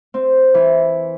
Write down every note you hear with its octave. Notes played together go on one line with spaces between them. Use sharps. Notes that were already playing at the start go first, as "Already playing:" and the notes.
C4
E3